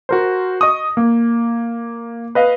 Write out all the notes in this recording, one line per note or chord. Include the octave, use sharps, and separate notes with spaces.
F#4 A#4 C5
D#5 C#6 D#6
A#3
B4 D#5 F5